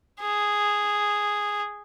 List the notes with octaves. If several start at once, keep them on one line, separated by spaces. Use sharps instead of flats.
G#4